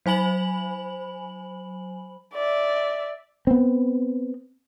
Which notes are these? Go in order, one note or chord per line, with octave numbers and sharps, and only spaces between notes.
F#3 C5 G#5 B5 F#7
D5 E5
B3 C4